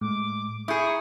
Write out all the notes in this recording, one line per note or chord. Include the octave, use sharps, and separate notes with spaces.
A2 G#3 A3 D6
E4 G#4 C#6 D#6 G6 G#6
A#5 C#6 D#6 C#7